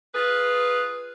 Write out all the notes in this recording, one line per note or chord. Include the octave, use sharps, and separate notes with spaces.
F4 G#4 B4